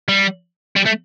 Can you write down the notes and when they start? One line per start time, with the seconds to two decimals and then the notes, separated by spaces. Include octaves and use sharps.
0.08 G3
0.76 G3
0.85 A3